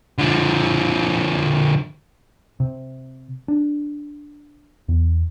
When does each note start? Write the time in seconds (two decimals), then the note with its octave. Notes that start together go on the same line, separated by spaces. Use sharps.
0.19 D3 F3
2.60 C3
3.48 D4
4.89 E2